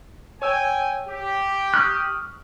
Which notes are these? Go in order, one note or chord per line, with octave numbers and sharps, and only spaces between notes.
C#5 G5 G#5 E6
G4
C#6 D#6 F6 F#6